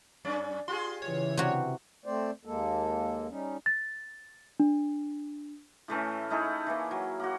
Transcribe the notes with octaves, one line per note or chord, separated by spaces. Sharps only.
F#2 C#4 D5
F4 G4 G#4 C6
C#3 E3 C#5
C3 F#4
A3 C4 C5 D5
D#2 G#3 A#3 A4
G3 C#4 D#4
A6
D4
A2 E3 A3 C#4
A3 D#4 E4 G#4
E3 A#3
F#3
A#3 F#4